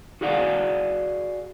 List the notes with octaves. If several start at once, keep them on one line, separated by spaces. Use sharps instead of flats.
F#4 G#4 D5 F5 F#5